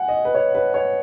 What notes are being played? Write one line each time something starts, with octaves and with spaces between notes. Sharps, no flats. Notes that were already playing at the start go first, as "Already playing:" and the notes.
Already playing: F#5 G#5
D#5
B4
C#5
B4
C#5